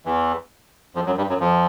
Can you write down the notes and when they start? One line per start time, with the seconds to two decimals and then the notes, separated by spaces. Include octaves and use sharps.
0.05 E2 E3
0.95 F2 F3
1.06 F#2 F#3
1.17 G2 G3
1.29 F#2 F#3
1.40 F2 F3